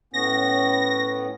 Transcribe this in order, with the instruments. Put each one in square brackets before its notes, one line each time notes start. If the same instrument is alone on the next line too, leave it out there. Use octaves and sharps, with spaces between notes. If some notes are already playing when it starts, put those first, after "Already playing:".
[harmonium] A2 B3 C#4 [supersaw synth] A#6